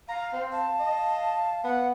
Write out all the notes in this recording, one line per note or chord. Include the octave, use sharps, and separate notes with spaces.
F5 A#5
C4
F5 A5
D#5
B3 F#5